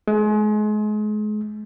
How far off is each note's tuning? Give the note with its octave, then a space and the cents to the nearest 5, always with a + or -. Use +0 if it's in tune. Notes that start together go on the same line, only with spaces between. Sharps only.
G#3 +35